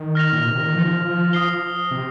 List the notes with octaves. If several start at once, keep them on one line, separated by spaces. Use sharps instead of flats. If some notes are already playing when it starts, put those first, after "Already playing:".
Already playing: D#3
F6 A#6 F7
A#2
C3
D#3
F3
D#6 C7 G7
C3